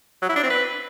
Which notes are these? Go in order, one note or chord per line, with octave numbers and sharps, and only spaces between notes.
F#3
E4
D4
C4
B4